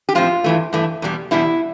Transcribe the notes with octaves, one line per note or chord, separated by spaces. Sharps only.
G4
A2 F3 C4 F4
G2 E3 A3
G2 E3 A3
E2 B2 G3
E2 B2 G3 E4